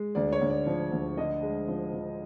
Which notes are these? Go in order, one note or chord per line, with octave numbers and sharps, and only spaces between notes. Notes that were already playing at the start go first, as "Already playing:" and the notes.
Already playing: G#3
D2 D5
C#5
D2
D5
F3
D2
D3 D#5
G#3
F3
F3